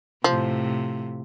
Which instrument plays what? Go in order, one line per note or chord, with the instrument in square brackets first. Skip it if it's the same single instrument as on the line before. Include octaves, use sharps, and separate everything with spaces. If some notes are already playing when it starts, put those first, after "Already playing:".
[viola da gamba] A2 C3 [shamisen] F3